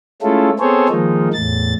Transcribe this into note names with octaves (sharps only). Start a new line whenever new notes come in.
G#3 A3 C#4 E4 F4 A4
B3 C4 G#4 A4 C5 C#5
D#3 F3 G#3 A#3 D#4
E2 A2 A6